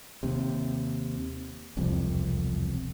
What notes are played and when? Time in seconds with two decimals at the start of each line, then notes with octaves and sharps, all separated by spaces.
0.23 D#2 C3
1.77 E1 C2 F2